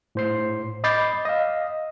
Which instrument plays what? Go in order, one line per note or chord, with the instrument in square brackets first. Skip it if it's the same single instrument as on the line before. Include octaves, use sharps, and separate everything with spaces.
[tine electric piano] A2 C5 C7
D#5 B5 D6 G6 A6 C7
D#5 F5